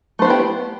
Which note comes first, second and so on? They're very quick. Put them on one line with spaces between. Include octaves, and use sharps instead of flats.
A3 C5 B3 E4 G4